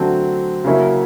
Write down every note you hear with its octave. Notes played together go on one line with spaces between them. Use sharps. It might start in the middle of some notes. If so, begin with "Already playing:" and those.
Already playing: D3 F#3 A3 C4
C#3 F#3 A#3 C#4 E4